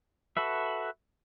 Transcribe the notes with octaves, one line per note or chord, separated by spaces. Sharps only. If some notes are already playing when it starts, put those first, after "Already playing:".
F#4 A4 B4 E5